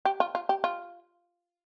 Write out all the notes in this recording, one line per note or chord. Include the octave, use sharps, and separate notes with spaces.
G4
F4
F4
G4
F4